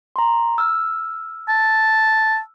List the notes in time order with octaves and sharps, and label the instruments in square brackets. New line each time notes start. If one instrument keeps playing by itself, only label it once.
[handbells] A#5 C6
E6 F6
[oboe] A5